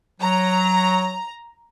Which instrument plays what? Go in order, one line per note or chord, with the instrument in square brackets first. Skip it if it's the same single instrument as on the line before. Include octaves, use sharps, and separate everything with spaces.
[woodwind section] F#3 [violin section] A#5